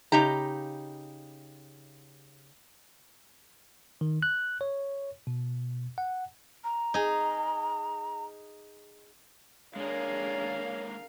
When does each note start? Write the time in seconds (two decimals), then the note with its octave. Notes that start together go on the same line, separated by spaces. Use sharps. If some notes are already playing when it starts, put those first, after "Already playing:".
0.12 C#3 D#4 G4 A#5
4.01 D#3
4.23 F#6
4.61 C#5
5.27 B2
5.98 F#5
6.64 A#5
6.94 D#4 G#4
9.76 G#3 A#3 D4 G#4 A#4 C#5 F5